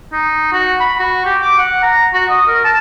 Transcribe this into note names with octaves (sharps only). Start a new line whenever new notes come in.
D#4
F#4
B5
F#4
G4
D6
F#5
A#5
F#4
D#5
A#4
A5